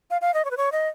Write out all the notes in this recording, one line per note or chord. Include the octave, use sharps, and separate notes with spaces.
F5
F5
D#5
C#5
B4
C#5
D#5